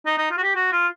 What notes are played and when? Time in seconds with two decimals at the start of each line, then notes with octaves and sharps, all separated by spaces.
0.06 D#4
0.18 D#4
0.30 F4
0.37 F#4
0.43 G4
0.56 F#4
0.72 F4